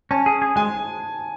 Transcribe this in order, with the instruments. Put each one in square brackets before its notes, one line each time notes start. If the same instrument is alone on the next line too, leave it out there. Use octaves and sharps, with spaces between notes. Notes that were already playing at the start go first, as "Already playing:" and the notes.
[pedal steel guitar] C#4 [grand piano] A5
[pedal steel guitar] G#4
G#4
[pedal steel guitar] G#3 [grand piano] G#5